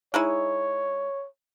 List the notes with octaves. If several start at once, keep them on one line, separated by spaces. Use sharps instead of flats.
G#3 D#4 E4 C#5